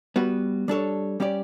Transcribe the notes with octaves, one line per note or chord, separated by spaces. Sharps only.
G3 B3 F#4 B4
G3 D4 A4 C#5
G3 C#4 G4 D5